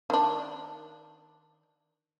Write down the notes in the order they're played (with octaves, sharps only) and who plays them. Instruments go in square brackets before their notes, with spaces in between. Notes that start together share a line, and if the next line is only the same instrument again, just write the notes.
[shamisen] D#3 D4